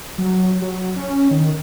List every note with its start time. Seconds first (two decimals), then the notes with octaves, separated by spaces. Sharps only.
0.18 F#3
0.62 F#3
0.96 C#4
1.31 D#3